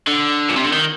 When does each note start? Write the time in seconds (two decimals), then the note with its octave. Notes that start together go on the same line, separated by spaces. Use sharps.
0.07 D3
0.49 A#2
0.57 C3
0.65 D3
0.73 D#3